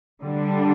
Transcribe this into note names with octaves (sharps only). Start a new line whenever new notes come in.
D3 G3 D4